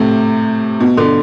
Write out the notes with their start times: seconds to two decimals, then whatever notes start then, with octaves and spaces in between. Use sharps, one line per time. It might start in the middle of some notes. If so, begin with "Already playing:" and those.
Already playing: A2 C3
0.80 B2
0.97 B2 D3